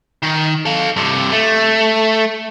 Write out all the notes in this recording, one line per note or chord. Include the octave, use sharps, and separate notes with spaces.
D#3
A4 F5
G2 C3
A3